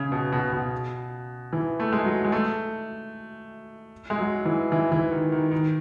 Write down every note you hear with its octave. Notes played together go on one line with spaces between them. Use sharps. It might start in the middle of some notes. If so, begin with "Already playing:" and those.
Already playing: C#3
B2
B2
B2
E3
A3
G#3
F#3
G#3
A3
G#3
F#3
E3
E3
E3
D#3
D#3
D#3